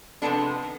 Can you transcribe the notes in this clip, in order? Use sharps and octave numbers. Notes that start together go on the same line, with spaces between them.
C3 F3 G#3 B3 D4 A4
D#3